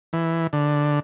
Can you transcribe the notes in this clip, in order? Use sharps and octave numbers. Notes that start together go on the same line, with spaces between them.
E3
D3